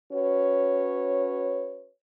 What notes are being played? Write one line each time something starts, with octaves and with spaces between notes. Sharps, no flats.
C#4 F#4 B4 C#5